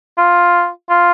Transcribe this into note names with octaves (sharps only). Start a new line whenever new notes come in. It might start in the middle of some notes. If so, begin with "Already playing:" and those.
F4
F4